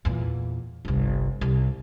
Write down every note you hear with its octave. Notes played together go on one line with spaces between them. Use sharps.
E2 A#2
G1 C2
C2